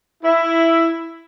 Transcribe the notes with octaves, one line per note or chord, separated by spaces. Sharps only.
E4